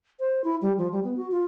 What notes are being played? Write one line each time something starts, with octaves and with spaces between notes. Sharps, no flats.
C5
E4
G3
F3
G3
B3
F#4
F4